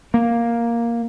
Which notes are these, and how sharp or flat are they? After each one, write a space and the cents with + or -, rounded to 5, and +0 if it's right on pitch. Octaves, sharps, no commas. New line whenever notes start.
A#3 +5